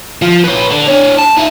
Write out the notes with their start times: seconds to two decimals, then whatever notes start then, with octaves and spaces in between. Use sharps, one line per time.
0.22 F3
0.44 B4 C#5
0.70 D3
0.87 D4 C#5
1.18 A5
1.37 D#4 E5